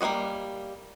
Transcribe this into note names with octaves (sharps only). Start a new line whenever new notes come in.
G3 A#3 C#4 F#4 D#5